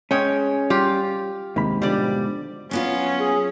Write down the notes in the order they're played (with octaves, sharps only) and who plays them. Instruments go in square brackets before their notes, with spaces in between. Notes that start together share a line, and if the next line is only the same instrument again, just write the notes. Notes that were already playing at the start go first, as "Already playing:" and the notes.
[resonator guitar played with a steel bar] G#3 C#5 [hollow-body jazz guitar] C#4 [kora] G5
[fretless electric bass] G3 [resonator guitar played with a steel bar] F4 [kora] G4
[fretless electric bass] D#2 C3 D#3 [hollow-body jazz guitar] G#2 B5
[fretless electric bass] B2 D3 F3 [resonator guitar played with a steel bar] G3 D5
[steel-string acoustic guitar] F#3 B3 F4 [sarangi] C#4
[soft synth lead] G#4